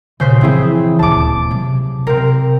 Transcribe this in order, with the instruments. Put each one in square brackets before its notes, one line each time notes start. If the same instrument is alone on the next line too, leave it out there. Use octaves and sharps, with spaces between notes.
[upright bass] A#2 E3 [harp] C#3 C5 B6
[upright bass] E3 F3 [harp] C4 E4 G#4
[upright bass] D#1 D2 [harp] A5 D6
[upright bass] C3 F#3
[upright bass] C3 [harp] C4 A#4